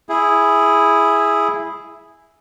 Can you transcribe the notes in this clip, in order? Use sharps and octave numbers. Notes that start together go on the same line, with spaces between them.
E4 G#4